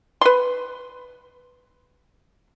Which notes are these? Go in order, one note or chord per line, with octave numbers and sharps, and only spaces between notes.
B4 C6